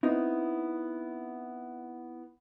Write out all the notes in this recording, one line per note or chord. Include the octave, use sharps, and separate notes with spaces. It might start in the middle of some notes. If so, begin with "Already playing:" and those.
B3 C4 D#4 E4